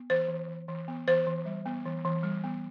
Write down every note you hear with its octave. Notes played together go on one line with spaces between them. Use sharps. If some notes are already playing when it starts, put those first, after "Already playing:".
Already playing: B3
E3 C5
E3
E3
E3
B3
E3 C5
E3
G3
B3
E3
E3
G3
B3